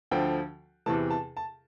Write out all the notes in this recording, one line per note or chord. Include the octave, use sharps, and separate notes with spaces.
D2 D3 F3 G5
E2 C3 E3 A5
A5
A5